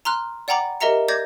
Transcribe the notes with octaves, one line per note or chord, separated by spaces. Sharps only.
A#5 C6 F6 F#6
D5 F#5 G5 A#5 B5 D6
G4 A#4 D#5 E5 A#5 C#7
D5 D6 G6 G#6 A#6